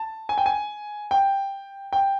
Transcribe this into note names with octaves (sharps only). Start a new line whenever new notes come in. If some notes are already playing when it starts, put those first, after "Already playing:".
Already playing: A5
G#5
G5
G#5
G5
G5